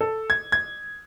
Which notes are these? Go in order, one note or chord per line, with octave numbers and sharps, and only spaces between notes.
A4
G#6
G#6